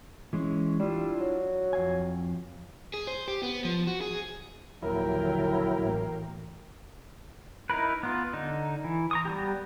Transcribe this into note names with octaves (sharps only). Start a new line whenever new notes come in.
E3 G#3 C#4
G3 D4 E4 F4
F#3
F2 F5 G#5
G#4
C5
G4
B3
F3
F#4
G#4
A#1 D#2 D3 F#3 E4 A#4 G5
A1 A#3
D#4 E4 A#4 B4
B3 F4
D3 D#4
E3
A#5 C#6 D#6
G3 B3 G4